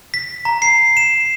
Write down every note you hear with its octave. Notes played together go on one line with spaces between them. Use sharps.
B6
A#5
C7
E7